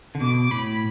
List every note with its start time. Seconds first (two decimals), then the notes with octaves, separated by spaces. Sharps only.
0.15 D3
0.21 B2 D6
0.51 A2 B5